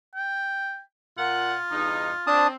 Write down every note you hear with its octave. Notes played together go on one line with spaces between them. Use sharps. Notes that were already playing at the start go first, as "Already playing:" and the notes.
G5
A#2 F4 F#5
E2 G2 D#4
C4 D4 A5 D#6